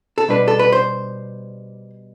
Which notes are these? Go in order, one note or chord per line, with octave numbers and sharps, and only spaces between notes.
A4
B2 G3 D4 B4
A4
B4
C5